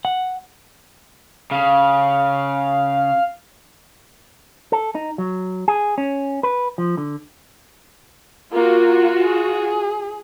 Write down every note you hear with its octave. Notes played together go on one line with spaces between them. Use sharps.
F#5
C#3 F5
A4
D#4
F#3
G#4
C#4
B4
F3
D3
A#3 F4 F#4
G#4